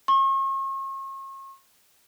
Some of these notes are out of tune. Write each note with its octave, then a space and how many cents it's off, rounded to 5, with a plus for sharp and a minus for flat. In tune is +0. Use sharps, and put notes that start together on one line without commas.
C#6 -40